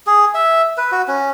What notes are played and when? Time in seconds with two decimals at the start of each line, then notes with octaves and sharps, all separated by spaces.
0.07 G#4
0.35 E5
0.78 B4
0.92 F#4
1.08 C#4